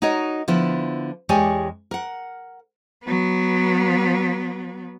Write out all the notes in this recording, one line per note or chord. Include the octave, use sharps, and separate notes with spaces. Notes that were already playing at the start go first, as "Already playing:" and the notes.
D#4 F#4 A#4 C#5 D#5
D3 F3 B3 E4
E2 G#3 G4 C#5 D5 G#5
A#4 F#5
F#3 B3